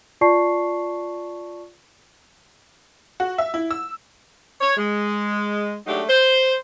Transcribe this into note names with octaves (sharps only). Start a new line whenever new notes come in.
F4 D5 A5 C#6 C7
F#4
E5
E4
E6
C#5
G#3
F#3 G#3 A3 D4 D#4 G4
C5